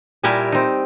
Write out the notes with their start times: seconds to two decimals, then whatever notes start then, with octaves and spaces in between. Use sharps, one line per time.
0.23 A#2 G3 E4 G4 A#4 G#5
0.52 C4 D#4